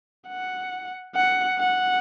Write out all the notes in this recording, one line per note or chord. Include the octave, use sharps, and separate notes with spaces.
F#5
F#5
F#5